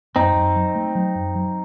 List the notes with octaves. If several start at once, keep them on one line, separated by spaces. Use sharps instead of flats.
F#2 C4 D#4
F#2
F#3
A3
F#3
F#2
F#3